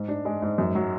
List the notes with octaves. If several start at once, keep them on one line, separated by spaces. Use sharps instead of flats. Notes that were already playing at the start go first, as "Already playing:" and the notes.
Already playing: G#2
D4
G#3
G#2
F#2
F#3